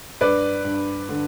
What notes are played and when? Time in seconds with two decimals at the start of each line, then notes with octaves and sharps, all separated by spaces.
0.21 G2 B4 D5
0.65 G2
1.09 D3